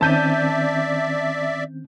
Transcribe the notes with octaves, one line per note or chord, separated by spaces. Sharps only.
D#3 C4 C#4 D5 E5 A5 G6 D#7